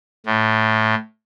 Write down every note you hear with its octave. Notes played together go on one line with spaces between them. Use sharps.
A2